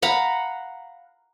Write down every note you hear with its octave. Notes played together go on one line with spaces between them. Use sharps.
F5 F#5 A#5 B5